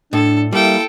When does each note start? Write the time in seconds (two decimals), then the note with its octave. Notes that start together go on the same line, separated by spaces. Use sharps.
0.13 A2 D4 A4
0.53 G3 A#3 E4 A4 G5